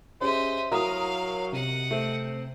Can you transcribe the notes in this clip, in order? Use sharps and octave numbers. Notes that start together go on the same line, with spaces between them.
C#4 G4 G#4 C5 D#5 E5
F#3 E4 F#4 A#4 F5 A#5 D#6
C3 D#5 F#5
A3 C4